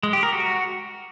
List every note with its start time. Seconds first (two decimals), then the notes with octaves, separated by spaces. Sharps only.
0.03 G#3
0.13 G4
0.23 A#4
0.33 F#4